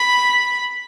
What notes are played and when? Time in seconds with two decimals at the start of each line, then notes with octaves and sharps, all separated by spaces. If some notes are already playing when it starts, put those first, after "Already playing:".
Already playing: B5